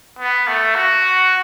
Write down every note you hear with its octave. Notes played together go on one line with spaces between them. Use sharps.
B3
A3
F#4